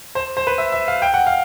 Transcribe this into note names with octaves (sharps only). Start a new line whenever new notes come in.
C5
C5
B4
E5
E5
F5
G5
F#5
F5